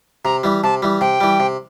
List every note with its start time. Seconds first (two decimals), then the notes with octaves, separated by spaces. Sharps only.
0.25 C3 A#5
0.43 E3 G3
0.63 C3 A5
0.82 E3 G3
1.01 C3 G5
1.21 E3 G3
1.40 C3